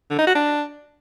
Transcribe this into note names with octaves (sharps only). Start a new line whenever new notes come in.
D3
D#4
F#4
D4